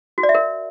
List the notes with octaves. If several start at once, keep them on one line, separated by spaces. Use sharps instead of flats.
F#4
D5
E5
A#4